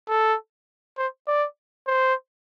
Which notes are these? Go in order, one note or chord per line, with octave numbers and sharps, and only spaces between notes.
A4
C5
D5
C5